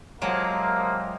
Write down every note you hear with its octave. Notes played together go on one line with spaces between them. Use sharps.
C3 F3 F#3 G#3 A#3